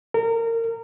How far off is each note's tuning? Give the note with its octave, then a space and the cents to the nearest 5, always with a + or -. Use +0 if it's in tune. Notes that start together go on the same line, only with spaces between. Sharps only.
A#4 -25